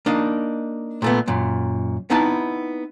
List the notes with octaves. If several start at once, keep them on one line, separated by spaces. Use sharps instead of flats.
A#3 D4 D#4
A#2 A3 B3
F#2 A#2
B3 C4 D#4 E4 A5